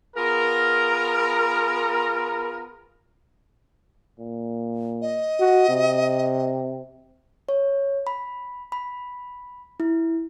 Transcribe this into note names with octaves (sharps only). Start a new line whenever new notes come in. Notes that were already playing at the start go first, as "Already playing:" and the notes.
B3 F4 G#4 A#4
A#2
D#5
F#4
C3
C#5
B5
B5
E4